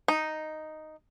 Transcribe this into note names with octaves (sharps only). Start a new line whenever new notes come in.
D#4